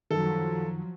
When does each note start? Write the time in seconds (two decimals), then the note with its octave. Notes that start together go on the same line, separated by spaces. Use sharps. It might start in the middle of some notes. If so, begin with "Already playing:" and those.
0.11 F#2 D#3 F3 F#3 A4